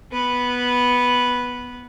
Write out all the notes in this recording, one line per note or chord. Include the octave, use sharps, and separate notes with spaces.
B3 B4